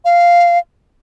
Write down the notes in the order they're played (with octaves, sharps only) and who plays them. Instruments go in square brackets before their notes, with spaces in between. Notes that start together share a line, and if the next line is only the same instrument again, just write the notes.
[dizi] F5